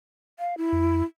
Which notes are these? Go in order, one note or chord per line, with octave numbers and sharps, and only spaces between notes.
F5
E4
F2